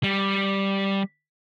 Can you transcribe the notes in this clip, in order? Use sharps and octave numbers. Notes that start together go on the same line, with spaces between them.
G3